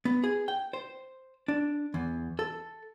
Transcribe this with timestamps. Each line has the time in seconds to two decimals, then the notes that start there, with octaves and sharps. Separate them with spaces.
0.05 B3
0.24 G#4
0.48 G5
0.73 C5
1.48 D4
1.94 E2
2.39 A4